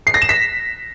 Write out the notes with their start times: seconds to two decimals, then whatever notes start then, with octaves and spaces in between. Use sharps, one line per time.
0.07 C7
0.14 A#6
0.22 E7
0.29 B6